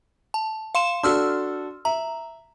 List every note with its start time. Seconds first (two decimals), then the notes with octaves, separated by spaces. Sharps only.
0.34 A5
0.75 F5 C6 E7
1.03 D4 F#4 A4 C6 E6 F6
1.85 E5 A#5